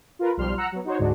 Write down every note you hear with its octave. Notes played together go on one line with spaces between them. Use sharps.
F4 A#4 B4
B1 F3 G3 C6 F6
F#5 A#5 E6 F#6 C#7
F#3 B3
D#4 F#4 C5 C#5
D2 G#2 G#3 D4 F#4